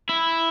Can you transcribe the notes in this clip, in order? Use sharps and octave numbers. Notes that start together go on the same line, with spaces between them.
E4